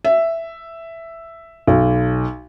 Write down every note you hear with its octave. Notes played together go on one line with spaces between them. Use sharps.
E5
B1